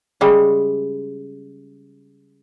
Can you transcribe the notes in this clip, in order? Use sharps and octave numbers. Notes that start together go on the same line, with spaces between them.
C#3 G3 G#3